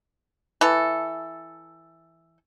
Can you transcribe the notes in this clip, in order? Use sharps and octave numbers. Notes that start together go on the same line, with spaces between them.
E3 A4